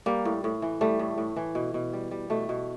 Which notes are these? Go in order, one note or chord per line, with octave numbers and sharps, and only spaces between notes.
G3 A#3
A2
A2
E3
G3 A3
A2
A2
E3
B2
B2
G3
G3
B2 A3
B2